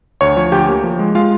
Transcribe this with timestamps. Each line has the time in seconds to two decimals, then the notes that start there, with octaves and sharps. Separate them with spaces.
0.21 D2 C#5 C#6
0.37 F3
0.52 D2 G4 G5
0.68 A#3
0.84 F3
0.99 G#3
1.15 G#3 F4 F5